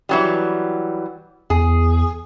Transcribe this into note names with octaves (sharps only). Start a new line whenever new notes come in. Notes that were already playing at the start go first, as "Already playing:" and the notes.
E3 F#3 G3
E2 G#4